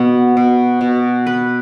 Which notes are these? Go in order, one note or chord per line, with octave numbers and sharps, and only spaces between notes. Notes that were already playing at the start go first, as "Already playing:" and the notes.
Already playing: B2 B3
B2
B2
B4